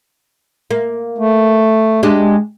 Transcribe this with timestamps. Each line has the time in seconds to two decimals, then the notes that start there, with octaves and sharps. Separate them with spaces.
0.71 A#3
1.18 A3
2.03 G#3 D4 G4